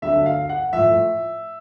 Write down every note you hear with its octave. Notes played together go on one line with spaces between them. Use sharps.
D2 D3 F#3 E5
F5
F#5
A2 F3 E5